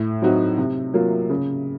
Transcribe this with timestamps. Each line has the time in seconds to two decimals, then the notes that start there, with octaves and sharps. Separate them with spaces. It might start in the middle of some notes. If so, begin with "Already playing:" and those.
Already playing: A2
0.22 F#3 C4 D#4 F#4
0.58 C3
0.94 F#3 A#3 F4
1.30 C#3